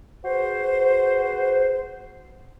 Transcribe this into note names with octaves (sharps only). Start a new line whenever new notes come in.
F#4 G#4 B4 C5